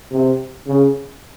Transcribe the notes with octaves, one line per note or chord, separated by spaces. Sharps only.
C3
C#3